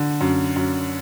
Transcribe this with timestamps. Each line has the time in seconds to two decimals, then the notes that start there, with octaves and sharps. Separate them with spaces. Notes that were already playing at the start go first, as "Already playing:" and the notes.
Already playing: D3
0.21 F#2
0.56 F#2